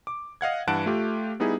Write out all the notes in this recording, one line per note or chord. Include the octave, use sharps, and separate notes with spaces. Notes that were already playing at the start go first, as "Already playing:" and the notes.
D6
D#5 F5 F#5 G#6
G2 E3 F#5 A5 F#6 D7
A3 F4 G4
G3 B3 D#4 E4 G#4